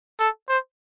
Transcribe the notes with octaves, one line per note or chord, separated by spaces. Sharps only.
A4
C5